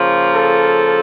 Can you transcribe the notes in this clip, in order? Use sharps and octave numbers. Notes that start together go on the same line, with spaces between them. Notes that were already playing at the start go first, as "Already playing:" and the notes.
Already playing: C#3 F3 A#3
A4